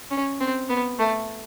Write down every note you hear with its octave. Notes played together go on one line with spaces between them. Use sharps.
C#4
C4
B3
A3